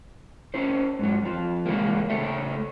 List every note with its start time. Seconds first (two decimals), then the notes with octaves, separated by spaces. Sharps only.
0.54 C#4 E4 C5
0.99 G#2 F#3
1.23 F2 F3
1.66 A2 C3 E3 G#3 A#3
2.10 A2 C#3 A3 A4 E5